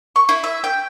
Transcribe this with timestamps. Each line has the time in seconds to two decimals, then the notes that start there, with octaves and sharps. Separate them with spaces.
0.16 C#6
0.29 E4
0.44 E5
0.64 G5